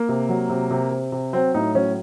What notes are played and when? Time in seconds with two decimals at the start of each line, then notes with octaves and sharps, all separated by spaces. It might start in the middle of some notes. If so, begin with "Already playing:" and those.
Already playing: A#3
0.09 C3
0.29 F#3
0.50 C3
0.71 C3
0.91 C3
1.12 C3
1.33 F#3 C4
1.54 A2 D#4
1.75 F#3 C#4